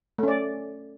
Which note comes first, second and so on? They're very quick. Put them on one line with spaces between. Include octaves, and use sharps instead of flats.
A3 C#4 D5